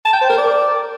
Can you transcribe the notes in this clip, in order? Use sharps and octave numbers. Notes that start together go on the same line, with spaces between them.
A5
G5
C5
A#4
D5